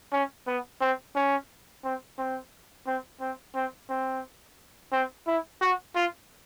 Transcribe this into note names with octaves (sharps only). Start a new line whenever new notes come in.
C#4
B3
C4
C#4
C4
C4
C4
C4
C4
C4
C4
E4
F#4
F4